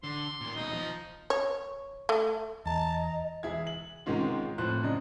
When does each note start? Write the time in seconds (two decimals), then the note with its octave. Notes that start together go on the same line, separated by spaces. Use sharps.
0.03 D3 C6
0.41 A#2 D#3
0.56 D#2 B2 D#4
0.73 F3
1.30 C#5
2.09 A3
2.66 E2 D#5 A5 A#5
3.43 E1 E4 G#4 G#6
3.67 F#7
4.06 G#2 C3 D#3 G#3 C#4 F4
4.58 F2 A2 C5 F#6
4.83 F#2 C#3 D4 D#5